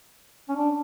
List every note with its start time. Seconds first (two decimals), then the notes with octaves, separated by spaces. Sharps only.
0.49 C#4
0.56 D4